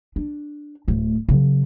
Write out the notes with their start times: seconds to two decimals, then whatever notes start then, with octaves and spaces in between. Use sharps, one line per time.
0.16 D4
0.88 D1 A3
1.29 C#3 F#3